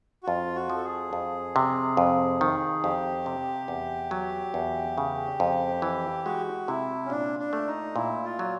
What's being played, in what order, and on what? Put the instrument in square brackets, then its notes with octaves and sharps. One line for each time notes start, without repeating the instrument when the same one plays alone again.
[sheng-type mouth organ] F#4
[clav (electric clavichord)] F2 [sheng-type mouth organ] F4
[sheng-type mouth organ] F#4
[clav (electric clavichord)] F3
[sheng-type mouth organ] A4
G#4
[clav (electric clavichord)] F2
C3
F2
D#3
[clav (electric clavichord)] F2 [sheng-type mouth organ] G4
[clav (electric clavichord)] C3
E2
F#3
E2
C#3
F2
E3
[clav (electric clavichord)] G#3 [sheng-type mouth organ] F#4
[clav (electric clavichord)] C3 [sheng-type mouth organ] E4
[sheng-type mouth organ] C#4
[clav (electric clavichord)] A#2 [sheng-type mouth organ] D4
[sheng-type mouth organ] D4
[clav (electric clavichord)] A3
[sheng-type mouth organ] D#4
[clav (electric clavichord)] A#2 [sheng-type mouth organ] E4
[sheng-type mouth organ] F4
[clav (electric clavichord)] F#3